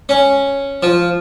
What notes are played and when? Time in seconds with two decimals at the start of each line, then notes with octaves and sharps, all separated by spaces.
0.09 C#4
0.83 F3